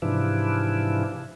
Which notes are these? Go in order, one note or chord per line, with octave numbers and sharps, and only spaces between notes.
G#2 C3 E3 F3 D4 E4